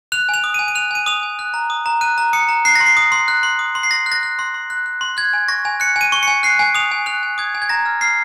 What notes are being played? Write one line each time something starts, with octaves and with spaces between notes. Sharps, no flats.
F#6 F7
G#5 F7
D#6
G#5 D#7
D#7
F#6 F7
G#5 D#7
D#6 F7
G#5
F#6
A#5
D#6
A#5
F#6 D#7
A#5
D#6 C#7
A#5
F#6 C7
A#6
C6
C7
D#6
C6
F#6
C6
D#6
C6
C7
C6 A#6
F#6
A#6
F#6
C6
C6
F#6
F#6
C6
F#6 G#6
G#5
C#6 A#6
G#5
F#6 C#7
G#5
D#7
C#6
G#5 C#7
F#6 C7
G#5
D#6 F7
G#5
F#6 F7
G#5
D#6 G#6
G#5
G#6
A#5 A#6
F6
F6 C7